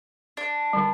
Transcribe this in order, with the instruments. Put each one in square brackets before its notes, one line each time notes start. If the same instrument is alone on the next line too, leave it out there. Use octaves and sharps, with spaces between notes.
[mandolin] D4
[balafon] D3 G3